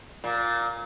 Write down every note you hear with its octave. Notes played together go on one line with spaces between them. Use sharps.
A#2